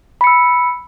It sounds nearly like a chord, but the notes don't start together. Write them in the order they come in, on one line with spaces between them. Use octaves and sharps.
B5 C#7 E6